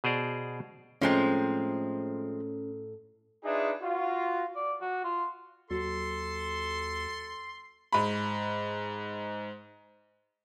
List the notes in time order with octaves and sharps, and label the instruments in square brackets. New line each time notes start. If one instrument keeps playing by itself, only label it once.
[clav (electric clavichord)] B2 G#4 C5 D5 A#5
[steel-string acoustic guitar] A2 A#5 [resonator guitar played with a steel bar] F3 G#3 C4 [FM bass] C#4
[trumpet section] D4 D#4 F4 G#4 B4 E5
F4 F#4
[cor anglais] D5
F#4
F4
[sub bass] D#2 [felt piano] F#3 [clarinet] A4 [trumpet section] C6
[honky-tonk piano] G#2 B5